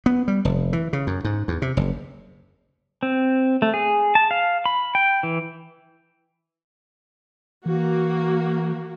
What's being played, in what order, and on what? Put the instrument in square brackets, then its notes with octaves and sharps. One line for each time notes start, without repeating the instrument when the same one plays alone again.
[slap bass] B3
G3
F1
E3
C#3
F#2
G#2
E2
C3
F#1
[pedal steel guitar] C4
A3
G#4
A5
F5
B5
G5
E3
[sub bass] E3 [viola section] A#3 F#4